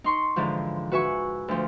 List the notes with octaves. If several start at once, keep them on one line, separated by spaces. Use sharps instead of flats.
D#4 C6 C#6
G#2 D3 E3 F3
F#4 B4 E5 G#5 C#6
D2 F3